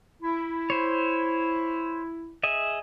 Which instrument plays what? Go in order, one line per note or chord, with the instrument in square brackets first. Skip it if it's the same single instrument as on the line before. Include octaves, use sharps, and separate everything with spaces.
[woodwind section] E4
[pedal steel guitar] C5 C#5
G#4 D#5 E5